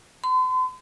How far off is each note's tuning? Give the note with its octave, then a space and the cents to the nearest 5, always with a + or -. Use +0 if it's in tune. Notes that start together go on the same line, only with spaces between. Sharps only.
C6 -45